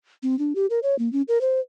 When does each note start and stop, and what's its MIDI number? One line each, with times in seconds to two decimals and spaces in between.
0.23 0.38 60
0.39 0.53 62
0.55 0.66 67
0.70 0.79 70
0.83 0.98 73
0.99 1.11 58
1.13 1.22 61
1.28 1.41 70
1.41 1.60 72